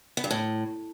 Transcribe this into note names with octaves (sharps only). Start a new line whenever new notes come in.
B3
G2
A2